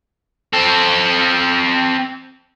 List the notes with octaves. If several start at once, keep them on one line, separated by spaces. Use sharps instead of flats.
C4 A4